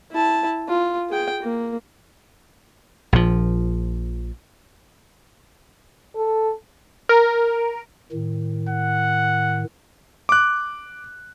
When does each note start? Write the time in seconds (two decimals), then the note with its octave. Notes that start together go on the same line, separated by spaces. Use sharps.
0.12 E4 A5
0.68 F4
1.10 G#4 G5
1.43 A#3
3.13 A#1 F3
6.15 A4
7.09 A#4
8.12 A2 D#3
8.69 F#5
10.29 D6 F#6